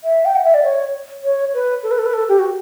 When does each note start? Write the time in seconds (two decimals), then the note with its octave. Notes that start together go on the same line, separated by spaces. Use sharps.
0.04 E5
0.25 G5
0.35 F#5
0.45 E5
0.54 D5
0.64 C#5
1.24 C#5
1.54 B4
1.83 A4
1.91 B4
1.98 A4
2.06 B4
2.14 A4
2.29 G4
2.39 F#4